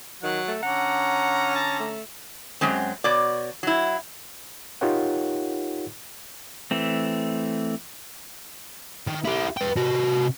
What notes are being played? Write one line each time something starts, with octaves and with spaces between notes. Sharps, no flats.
D#3 F#3 F#5
A3
D3 C#4 F#5 A#5
A5
A3
F#2 F#3 G#3 C4
B2 C#5 D5
F#3 E4
D#4 F4 G4 A#4 C#5 F#5
E3 A3 C4
D#3
E4 G4
B4 G5
C3 F#4